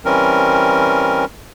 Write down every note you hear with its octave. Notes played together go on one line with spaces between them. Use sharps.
E3 G3 C4 C#4 A#4